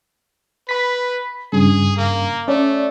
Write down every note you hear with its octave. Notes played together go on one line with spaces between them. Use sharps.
B4 B5 B6
G2 C#3 G#4
A#3
A3 C#4 D5